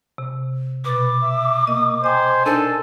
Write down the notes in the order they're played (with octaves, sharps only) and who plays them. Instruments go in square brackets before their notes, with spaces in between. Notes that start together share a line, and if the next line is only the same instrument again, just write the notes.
[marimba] C3
[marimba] B2 A6 [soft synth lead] B4 [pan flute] D6
[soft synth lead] E5
[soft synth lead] A#3 [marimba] D#5 E6
[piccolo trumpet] C5 [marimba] D#5 G5 A#5 [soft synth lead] G#5
[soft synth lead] D4 [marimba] D#4 A#4 [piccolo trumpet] A4 [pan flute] G#5